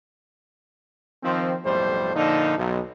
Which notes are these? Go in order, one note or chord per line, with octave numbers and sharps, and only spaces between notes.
D#3 F3 C4
B1 F2 A2 G3 C5
A#2 D3 F3 D#4
B1